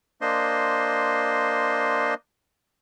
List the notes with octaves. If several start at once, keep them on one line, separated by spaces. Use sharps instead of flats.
A#3 D4 C5 D#5 C6